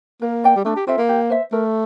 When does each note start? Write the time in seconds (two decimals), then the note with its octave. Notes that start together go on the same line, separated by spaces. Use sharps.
0.21 A#3 A#4
0.44 D5 G5
0.56 G3
0.65 A3 D4
0.76 G4
0.87 C4 F4 A4 E5
0.98 A#3
1.09 G4
1.30 C5 E5
1.52 A3 A#4